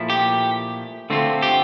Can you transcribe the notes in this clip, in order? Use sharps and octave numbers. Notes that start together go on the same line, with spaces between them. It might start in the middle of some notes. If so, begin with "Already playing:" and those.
Already playing: A#2 F3 A3 E4
G4
D3 A3 C4 F4
G4